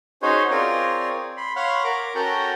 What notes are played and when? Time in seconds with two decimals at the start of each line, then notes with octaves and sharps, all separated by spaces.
0.22 C#4 D#4 F#4 G#4 C5 C#5
0.51 C4 F4 G#4 A#4 C#5 D5
1.37 B5 C6
1.56 C#5 F5 F#5 B5 C6
1.84 A#4 D6
2.15 C#4 F#4 A4 A#4 F#5 G5